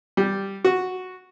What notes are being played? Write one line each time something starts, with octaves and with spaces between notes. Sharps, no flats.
G3
F#4